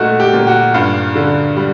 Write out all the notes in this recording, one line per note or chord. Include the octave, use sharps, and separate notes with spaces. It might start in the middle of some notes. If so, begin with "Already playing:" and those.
Already playing: A#2 A3 D#4 F#4
G4
A#2
F#4
G2 F4
D3
G3